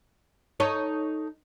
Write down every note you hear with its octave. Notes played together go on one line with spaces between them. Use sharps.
D#4 A4 C#5